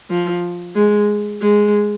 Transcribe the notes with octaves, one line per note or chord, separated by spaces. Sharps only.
F3
G#3
G#3